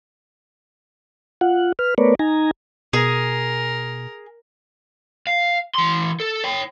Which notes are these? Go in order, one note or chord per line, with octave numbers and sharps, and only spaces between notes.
F4 F#5
B4 F6
A3 B3 A#4 B4 C#5 D5
D#4 G#5 A#5
B2 G#4 A#4
F5
E3 C6
A4
C#5 G5